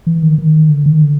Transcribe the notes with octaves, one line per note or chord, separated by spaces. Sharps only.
E3
D#3
D#3
D3
D#3
D3